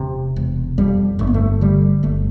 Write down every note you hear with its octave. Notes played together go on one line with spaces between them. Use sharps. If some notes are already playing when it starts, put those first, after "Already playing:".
Already playing: E1 C3
E1
F2 G3
G1 A3
B3
A3
D3 G3
G1 A3